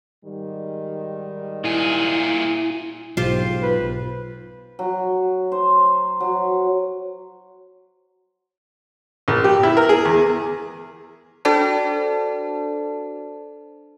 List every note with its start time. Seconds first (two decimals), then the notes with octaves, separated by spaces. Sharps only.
0.25 G#2 D#3 G3
1.64 A#2 E4 G#4
3.17 B1 G#2 F4 G4 C5
3.63 B4
4.79 F#3
5.52 C5
6.20 F#3
9.28 A#1
9.44 G4
9.63 E4
9.77 A#4
9.89 G#4
10.05 E2
11.45 D4 F#4 A4 C5 D5 A5